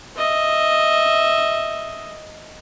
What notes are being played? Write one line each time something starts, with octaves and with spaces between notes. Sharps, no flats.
D#5 E5